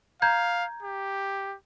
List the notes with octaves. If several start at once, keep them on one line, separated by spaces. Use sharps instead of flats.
F5 A#5 G6 G#6
G4